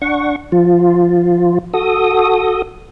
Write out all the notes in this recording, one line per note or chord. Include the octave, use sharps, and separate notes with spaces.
D4 F#5 C#6
F3 F4
F#4 A4 D#6